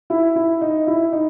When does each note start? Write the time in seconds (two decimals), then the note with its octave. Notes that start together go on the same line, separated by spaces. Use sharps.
0.10 E4
0.36 E4
0.61 D#4
0.87 E4
1.12 D#4